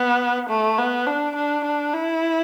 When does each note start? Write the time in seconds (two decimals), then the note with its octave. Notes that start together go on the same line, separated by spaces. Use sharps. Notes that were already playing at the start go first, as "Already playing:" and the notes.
Already playing: B3
0.50 A3
0.78 B3
1.07 D4
1.36 D4
1.65 D4
1.93 E4